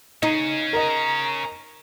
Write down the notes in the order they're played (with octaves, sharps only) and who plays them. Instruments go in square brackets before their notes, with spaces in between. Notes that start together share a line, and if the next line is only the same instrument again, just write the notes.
[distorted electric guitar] C#4 G#4 [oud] D#4
[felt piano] A#4 D#5 [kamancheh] A#5